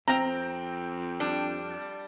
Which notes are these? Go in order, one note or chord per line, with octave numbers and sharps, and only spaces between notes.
F2 C4 G5 A#5
G3 D4